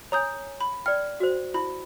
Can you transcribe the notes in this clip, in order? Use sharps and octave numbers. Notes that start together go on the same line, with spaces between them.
C#5 G#5 A#5 D#6 G6
B5
D5 G5 F6
F#4 C5
E4 B5